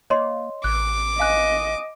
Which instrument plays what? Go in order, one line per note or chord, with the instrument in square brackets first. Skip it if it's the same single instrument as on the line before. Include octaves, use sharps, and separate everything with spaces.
[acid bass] A#3 [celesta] C#5 D#5 C6
[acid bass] A1 [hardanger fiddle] D6 [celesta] F#6
[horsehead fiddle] D#5 [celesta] F5 G#5 F#6